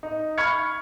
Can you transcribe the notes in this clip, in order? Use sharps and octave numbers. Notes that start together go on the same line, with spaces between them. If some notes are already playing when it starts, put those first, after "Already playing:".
D#4
B5 C#6 F6 G#6 C#7